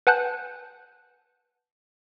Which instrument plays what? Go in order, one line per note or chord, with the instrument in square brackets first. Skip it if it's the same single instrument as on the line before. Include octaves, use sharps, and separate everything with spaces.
[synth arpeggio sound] B4 F#5 G#5 A5 F#6 G6